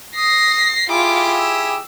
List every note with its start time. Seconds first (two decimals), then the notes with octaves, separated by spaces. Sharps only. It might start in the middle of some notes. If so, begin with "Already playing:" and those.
0.16 D#6 A#6 C7
0.90 E4 F4 G4 G#4 D6
1.37 E6